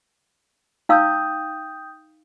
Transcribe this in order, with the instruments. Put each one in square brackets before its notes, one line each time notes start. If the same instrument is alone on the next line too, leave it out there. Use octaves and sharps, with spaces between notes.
[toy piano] D#4 F5 E6 [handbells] G5 D#6 G6